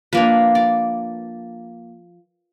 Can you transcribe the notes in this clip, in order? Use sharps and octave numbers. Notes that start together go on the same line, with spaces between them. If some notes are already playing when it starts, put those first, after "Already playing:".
F3 A#3 D4 B4
D5